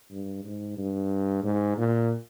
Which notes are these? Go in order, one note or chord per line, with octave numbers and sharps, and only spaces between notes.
G2
G#2
G2
G#2
A#2